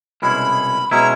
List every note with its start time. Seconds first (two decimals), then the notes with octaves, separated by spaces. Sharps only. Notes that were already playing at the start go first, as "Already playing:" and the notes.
0.22 C2 B2 G#3 C#4 E4 B5
0.91 B2 G#3 C#4 E4 A#5